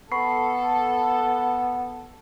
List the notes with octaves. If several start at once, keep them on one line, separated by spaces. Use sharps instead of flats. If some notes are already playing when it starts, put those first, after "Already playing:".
B3 A4 B5 C#6 C7